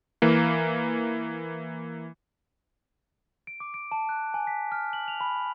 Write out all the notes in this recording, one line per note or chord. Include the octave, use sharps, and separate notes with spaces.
E3 A#3
D7
D6
D7
A5
F#6
G#5
B6
F6
F#7
F7
B5